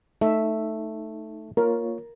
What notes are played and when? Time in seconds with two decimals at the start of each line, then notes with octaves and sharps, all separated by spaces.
0.21 A3 D#4 E5
1.57 A#3 F4 A#4 C#5